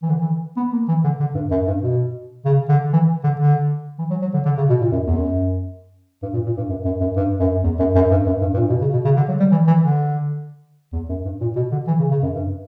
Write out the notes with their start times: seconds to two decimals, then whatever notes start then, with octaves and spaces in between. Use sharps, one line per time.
0.02 E3
0.09 D3
0.21 E3
0.57 B3
0.72 A#3
0.88 E3
1.04 D3
1.20 D3
1.35 G2
1.51 F#2
1.67 G2
1.82 B2
2.45 C#3
2.69 D3
2.93 E3
3.24 D3
3.40 D3
3.98 E3
4.10 F#3
4.22 F#3
4.34 D3
4.45 D3
4.57 C#3
4.69 B2
4.81 A#2
4.92 F#2
5.07 E2
5.16 F#2
6.22 G2
6.33 A#2
6.46 A#2
6.57 G2
6.69 F#2
6.85 F#2
7.00 F#2
7.16 G2
7.40 F#2
7.63 E2
7.79 F#2
7.95 F#2
8.11 G2
8.26 F#2
8.41 G2
8.54 G2
8.57 A#2
8.69 B2
8.81 C#3
8.93 B2
9.05 C#3
9.17 D3
9.28 F#3
9.40 G3
9.51 E3
9.67 E3
9.83 D3
10.92 E2
11.09 F#2
11.25 G2
11.41 A#2
11.56 B2
11.72 D3
11.87 E3
12.00 C#3
12.11 C#3
12.22 F#2
12.35 G2